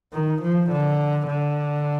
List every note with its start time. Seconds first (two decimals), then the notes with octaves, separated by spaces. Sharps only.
0.13 D#3
0.42 F3
0.71 D3
1.27 D3